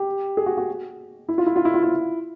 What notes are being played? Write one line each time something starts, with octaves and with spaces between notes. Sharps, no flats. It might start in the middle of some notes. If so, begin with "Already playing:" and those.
Already playing: G4
G#4
F#4
F#4
E4
F4
E4
F4
E4
F4
E4